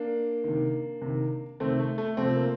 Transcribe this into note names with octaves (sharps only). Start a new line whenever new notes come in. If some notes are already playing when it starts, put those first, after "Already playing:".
Already playing: A#3 D4
C3 D#3
C3 D#3
C3 D#3 A3 C4
A3
A3
C3 F3 A3 C4
A#3